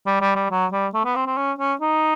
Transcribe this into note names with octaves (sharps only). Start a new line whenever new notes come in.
G3
G3
G3
F#3
G3
A3
B3
C4
C4
C#4
C#4
D#4